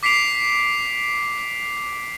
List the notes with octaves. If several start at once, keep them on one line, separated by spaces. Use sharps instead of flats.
D6 B6 C7 D7 F7